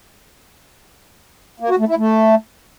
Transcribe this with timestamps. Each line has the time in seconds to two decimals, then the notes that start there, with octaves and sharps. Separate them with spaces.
1.60 A#3
1.69 F#4
1.79 A3
1.88 E4
1.98 A3